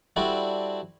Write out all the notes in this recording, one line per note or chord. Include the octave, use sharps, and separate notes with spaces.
G3 C4 D4 E4 F#4 A4